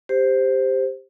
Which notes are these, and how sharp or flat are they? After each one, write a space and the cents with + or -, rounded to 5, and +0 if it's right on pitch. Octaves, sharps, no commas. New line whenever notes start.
G4 +10 C5 +0